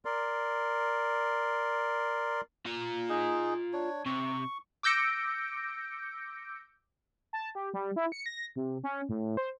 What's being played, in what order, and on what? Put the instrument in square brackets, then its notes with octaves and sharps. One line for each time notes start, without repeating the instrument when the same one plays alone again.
[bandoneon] A#4 D5 C6
[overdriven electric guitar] F4 A#5
[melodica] D#4 G#4
D4 C#5
[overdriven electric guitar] C3 [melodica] C#6
[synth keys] D6 E6 G6 A#6 C#7 D7
[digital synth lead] A5
G4
G3
E4
C#7
A#6
C3
C#4
A2
C5